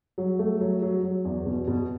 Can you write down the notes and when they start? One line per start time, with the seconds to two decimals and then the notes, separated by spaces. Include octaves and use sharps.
0.18 F#3
0.39 A3
0.60 F#3
0.82 F#3
1.03 F#3
1.25 E2
1.46 B2
1.68 B2